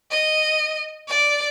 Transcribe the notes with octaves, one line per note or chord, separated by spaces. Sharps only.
D#5
D5